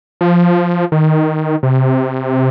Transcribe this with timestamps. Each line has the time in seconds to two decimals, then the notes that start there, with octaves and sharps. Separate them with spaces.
0.21 F3
0.92 D#3
1.63 C3